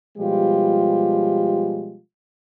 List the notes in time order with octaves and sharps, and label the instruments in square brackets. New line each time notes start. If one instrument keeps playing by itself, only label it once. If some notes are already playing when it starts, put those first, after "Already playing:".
[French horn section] B2 F3 G3 G#3 F4 G4